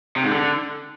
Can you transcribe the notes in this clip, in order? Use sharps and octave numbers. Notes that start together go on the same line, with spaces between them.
C3
G#2
D3